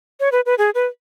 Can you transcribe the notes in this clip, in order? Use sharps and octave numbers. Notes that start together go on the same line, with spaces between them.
C#5
B4
B4
G#4
B4